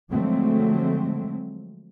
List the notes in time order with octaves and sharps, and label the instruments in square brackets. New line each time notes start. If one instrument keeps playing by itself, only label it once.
[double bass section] D3 F3 F#3 G#3 A3 C4